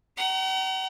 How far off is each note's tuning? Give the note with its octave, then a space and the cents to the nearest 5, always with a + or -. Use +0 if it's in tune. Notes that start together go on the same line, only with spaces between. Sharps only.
F#5 +45 A#5 +0